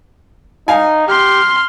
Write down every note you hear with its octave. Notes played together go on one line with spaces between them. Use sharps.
D#4 F5 G#5
G4 C6 F6